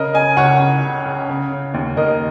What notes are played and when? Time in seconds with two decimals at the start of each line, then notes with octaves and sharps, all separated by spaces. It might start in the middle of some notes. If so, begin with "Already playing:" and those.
Already playing: C#3 A#4 D#5
0.14 C#3 D#5 G#5
0.37 C#2 C#5 F#5
0.60 C#3
0.82 C#3
1.06 C#3
1.29 C#3
1.52 C#3
1.74 D#2
1.97 D#2 A#4 D#5